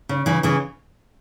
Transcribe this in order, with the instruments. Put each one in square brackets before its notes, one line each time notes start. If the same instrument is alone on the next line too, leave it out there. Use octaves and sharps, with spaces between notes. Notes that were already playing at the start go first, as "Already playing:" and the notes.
[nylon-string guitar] C#3
C#3 E3
C#3 E3